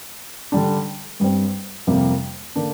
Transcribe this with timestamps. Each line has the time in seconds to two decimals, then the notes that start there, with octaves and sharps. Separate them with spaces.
0.52 D3 G3 D4
1.20 G2 G3 C4
1.87 F2 C3 G3 A#3
2.56 D3 A#3 D4